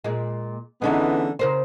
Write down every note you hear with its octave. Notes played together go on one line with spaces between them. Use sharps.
A#2 G#3
D3 E3 G#3 B3 C#4 D#4
C#3 A#4 C5